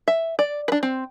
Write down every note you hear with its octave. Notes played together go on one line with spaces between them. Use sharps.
E5
D5
D4 B4
C4